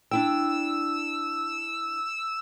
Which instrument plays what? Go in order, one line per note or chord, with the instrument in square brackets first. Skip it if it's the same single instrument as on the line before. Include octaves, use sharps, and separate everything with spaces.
[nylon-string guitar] D4 E4 G5 [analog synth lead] E6